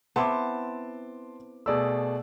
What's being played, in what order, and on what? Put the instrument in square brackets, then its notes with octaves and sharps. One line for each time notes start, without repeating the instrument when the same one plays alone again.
[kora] B3 C4 E4 [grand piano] A5 C6 D6
[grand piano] B2 A3 [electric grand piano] G#4 D5 E6